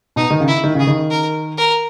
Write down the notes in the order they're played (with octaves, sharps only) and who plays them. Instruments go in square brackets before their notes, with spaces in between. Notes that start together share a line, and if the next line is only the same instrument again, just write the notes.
[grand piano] B2 [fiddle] D#4
[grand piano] D#3
C#3
[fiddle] E4
[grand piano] D#3
[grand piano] C#3 [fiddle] G#4
[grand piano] D#3
[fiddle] A#4
A#4